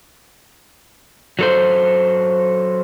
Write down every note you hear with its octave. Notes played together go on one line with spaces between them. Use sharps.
F#3 A4 C5